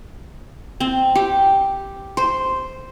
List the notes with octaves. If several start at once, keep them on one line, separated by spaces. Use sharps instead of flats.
C4
G4
C5